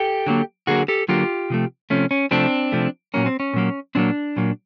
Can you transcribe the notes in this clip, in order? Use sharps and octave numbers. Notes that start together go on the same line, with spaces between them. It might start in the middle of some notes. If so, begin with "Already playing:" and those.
Already playing: G4 A4
D3 F#3 A#3
D3 F#3 A#3 F#4 G#4
G4 A4
D3 F#3 A#3 F4 G4
C3 F3 A3
C3 F3 A3 C#4
C#4
C3 F3 A3 C4 D4
C3 F3 A3
A#2 F#3 A#3 C#4
C4
C#4
A#2 F#3 A#3
A#2 F#3 A#3 C4 D4
A#2 F#3 A#3